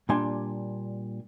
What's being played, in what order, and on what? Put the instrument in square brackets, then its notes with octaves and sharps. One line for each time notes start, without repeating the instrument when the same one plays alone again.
[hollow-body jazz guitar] A#2 G3 D4 G#5 C6